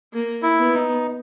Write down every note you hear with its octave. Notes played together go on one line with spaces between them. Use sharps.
A#3
E4
B3
D#4